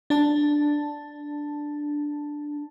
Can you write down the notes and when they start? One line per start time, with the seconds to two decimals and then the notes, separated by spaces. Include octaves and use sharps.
0.10 D4 A5